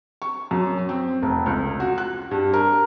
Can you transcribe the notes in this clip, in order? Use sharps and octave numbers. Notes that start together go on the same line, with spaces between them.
C#6
F#2
C4
F1
C#2
F#4
F#6
G2
A#4